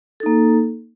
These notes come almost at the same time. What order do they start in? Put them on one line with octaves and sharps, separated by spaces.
A4 D#4 A#3